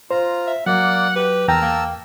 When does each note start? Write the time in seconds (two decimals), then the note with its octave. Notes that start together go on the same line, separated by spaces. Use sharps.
0.11 F4 C5 A#5
0.47 E5
0.66 F#3 A#3 D5 F#5
1.16 G4 B4
1.48 E2 A#4 G5 A5 A#5 E6
1.62 A#3